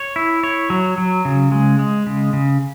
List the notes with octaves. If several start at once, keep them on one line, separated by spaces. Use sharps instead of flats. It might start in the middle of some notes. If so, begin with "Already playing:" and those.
Already playing: C#5
E4
C#5
F#3
F#3
C#3
G#3
G#3
C#3
C#3